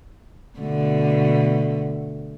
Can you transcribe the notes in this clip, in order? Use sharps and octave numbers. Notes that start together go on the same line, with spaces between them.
B2 D3 A3